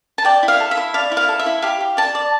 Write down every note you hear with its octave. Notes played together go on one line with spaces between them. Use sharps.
A5
D5 G5
E4
F5
A4
E5
E4
D5 F5
E4
F5
A4
E5
E4
G4 F5
G4
D5 A5
D5